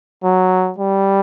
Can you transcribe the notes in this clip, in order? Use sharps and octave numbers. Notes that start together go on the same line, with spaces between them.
F#3
G3